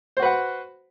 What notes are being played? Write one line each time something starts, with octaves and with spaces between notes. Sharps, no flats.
F#4 B4 C5 F#5